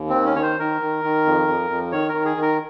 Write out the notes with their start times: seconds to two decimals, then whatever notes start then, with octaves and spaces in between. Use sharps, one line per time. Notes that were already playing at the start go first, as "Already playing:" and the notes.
Already playing: D#2
0.09 C4
0.14 D#3
0.25 C#4
0.36 D#3 C#5
0.42 C5
0.59 D#3 A#4
0.81 D#3
1.04 D#3
1.26 F2
1.48 F2
1.70 F2
1.92 D#3 C#5
2.09 A#4
2.14 D#3
2.25 G#4
2.37 D#3
2.42 A#4